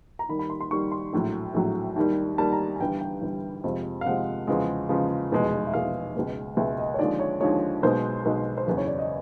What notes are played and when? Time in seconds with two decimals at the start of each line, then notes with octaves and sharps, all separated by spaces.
0.19 A#5
0.29 D#2 D#3 G3 B5
0.39 B5
0.50 C6
0.61 C6
0.71 D#2 D#3 G3 C#6
0.92 C6
1.13 A#1 A2 F#3
1.54 A#1 A2 F#3
1.96 D#2 D#3 G3
2.38 D#2 D#3 G3 A5
2.52 A#5
2.76 G#5
2.80 G1 G2 E3 G5
3.01 G5
3.22 G1 G2 E3
3.64 F2 C3 F3 G#3
4.01 F5
4.06 F2 C3 F3 G#3 F#5
4.47 E2 C#3 F3 G#3
4.89 E2 C#3 F3 G#3
5.31 F1 E2 B2 G#3
5.67 E5
5.73 F1 E2 B2 G#3 F5
6.15 C#2 B2 G#3
6.57 C#2 B2 G#3 E5
6.78 D#5
6.94 C#5
6.99 D#2 D3 F3 G#3 D5
7.20 C#5
7.40 D#2 D3 F3 G#3 C#5
7.83 B1 B2 G#3 C5
8.25 B1 B2 G#3
8.58 C5
8.67 F#1 E2 C#3 B4
8.77 C#5
8.87 D5
8.99 D#5